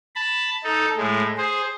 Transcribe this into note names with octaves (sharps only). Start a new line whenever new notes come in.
A5 B5
D#4 A4
A2 G#3
G#4 C5